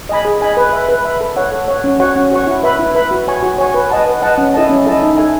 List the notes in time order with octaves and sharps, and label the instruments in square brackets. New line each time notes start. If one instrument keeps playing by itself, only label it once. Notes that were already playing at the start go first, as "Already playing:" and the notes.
[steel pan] D#5 G#5 B5
G#4
D#5 G#5 B5
B4
E5 B5
B4
E5 B5
A4
C#5 F#5
A4
C#5 F#5
C#4
F#4 C#5 F#5 C#6
C#4
F#4 C#5 F#5 C#6
E4
B4 E5 B5
E4
B4 E5 B5
F#4
C#5 G#5 C#6
F#4
C#5 G#5 C#6
B4
D#5 F#5 A5
B4
D#5 F#5 A5
C#4
E4 A4 D#5 A5
C#4
E4 A4 D#5 A5
D#4
A4 E5 G#5